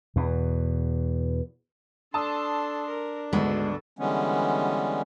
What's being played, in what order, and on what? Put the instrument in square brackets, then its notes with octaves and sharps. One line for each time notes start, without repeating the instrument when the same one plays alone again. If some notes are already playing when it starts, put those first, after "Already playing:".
[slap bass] E2 B2
[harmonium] D4 [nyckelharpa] A4 C6 [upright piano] A5 D#6 E6
[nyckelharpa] A#4
[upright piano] G#1 D2 B3 [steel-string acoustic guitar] G#3 [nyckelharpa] A4
[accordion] D3 E3 G3 G#3 B3 C#4